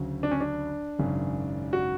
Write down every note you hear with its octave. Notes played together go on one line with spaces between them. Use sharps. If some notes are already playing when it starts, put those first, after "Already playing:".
Already playing: D2 C#3 F#3
D4
C#4
D4
G#1 F#2 C#3
F#4